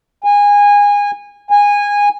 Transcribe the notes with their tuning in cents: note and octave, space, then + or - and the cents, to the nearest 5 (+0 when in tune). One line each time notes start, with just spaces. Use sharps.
G#5 -25
G#5 -20